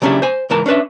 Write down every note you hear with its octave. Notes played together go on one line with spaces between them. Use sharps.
C#3 F#3 C#4 D4 E4 G4
C5 G#5
C#2 G#2 E3 A#4 A5
C#4 D4 B4 E5